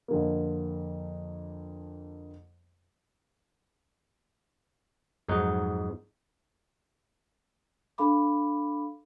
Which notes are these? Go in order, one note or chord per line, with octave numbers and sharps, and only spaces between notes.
F2 D3 A#3
F2 G#2 F#3 D#4 F#5
D4 A4 F5 B5 D6